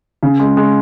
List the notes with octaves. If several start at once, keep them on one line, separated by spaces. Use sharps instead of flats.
C#3
G#3
G#3